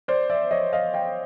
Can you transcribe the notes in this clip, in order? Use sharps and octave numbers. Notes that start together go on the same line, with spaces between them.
C5 D5
D5 E5
C#5 D#5
D#5 F5
F5 G5